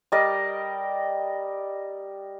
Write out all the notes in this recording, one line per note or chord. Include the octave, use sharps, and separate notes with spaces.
G3 A#4 D5 D#5